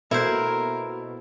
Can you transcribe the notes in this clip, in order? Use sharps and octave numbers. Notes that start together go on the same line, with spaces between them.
B2 A#3 E4 A4 A#4 C5 E5